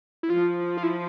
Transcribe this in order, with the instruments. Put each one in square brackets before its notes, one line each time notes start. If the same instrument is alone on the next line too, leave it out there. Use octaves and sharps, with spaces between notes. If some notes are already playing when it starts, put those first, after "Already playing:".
[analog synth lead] E4
[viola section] F3 [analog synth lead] F4
[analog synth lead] F4
E4